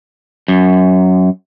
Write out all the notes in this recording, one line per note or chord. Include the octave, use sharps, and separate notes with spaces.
F#2